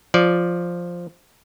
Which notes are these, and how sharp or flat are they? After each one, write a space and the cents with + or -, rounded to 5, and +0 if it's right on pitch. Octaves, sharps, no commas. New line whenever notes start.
F3 +0 D5 +0